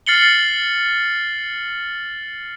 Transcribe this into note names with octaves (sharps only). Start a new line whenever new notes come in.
F6 A6 C7 C#7 F#7 G7